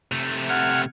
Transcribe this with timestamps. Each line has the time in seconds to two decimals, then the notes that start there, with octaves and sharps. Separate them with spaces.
0.12 C3 A3
0.49 F#5 F6 G#6